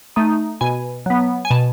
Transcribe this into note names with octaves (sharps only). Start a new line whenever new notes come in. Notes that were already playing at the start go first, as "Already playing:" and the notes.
A3 D#4
B2 G#5
F#3 B3
G#5
B2 A5